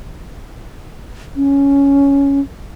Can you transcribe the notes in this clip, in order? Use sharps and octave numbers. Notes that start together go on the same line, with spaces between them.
C#4